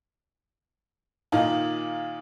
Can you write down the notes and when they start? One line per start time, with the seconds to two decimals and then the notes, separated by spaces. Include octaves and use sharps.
1.32 A#2 D#3 A#3 D#4 F4